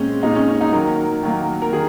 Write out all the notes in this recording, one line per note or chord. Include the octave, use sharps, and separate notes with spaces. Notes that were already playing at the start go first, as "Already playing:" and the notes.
Already playing: A#2 G#3 C4 C#4
A#2 G#3 C4 D#4
C#4
C#4
D#4
D#3 F#3 A#3 A#4
D#3 F#3 A#3
A#4
D#3 G#4